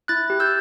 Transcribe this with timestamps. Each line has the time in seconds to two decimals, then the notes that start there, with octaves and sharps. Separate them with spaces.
0.08 E4 F#6 A6
0.30 G4
0.40 E6 G6